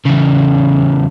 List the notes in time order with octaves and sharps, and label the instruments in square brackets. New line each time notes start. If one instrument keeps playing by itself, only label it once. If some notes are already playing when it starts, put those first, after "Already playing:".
[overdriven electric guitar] E2 C#3